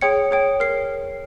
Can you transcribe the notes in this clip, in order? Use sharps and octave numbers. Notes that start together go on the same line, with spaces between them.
G#4 C#5 G5 C#7
G#4 C#5 G5
A#4 C7